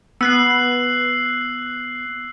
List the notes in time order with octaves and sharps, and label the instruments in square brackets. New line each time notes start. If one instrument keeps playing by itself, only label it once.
[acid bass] B3 [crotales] E6 F#6 C7